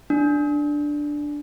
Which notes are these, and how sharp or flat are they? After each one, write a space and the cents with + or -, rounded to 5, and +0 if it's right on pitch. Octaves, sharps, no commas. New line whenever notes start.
D4 +0